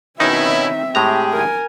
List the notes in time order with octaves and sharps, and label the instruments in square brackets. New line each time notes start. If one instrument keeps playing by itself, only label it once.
[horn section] B2 C#4 E4 [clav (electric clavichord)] D#3 D#4 [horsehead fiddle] C4 E5
[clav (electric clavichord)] A2 G#3 A#5 [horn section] G4 G#4
[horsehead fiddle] A#4 G#5